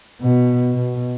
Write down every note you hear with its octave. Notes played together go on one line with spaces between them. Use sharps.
B2
B2